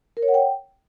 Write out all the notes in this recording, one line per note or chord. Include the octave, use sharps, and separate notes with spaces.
A#4
C#5
F#5
G5